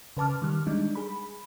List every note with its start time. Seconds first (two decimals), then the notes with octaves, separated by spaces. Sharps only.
0.17 C#3 B4 A5 D6 F6
0.42 D#3 G3 F6
0.67 G3 G#3 D4 D#4
0.95 G#4 B5